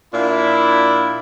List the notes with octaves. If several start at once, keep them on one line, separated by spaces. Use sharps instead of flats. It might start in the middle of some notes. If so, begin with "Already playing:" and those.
A#2 D4 E4